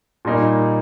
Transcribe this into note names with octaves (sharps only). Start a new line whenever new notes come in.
A#2 G3 A#3 D#4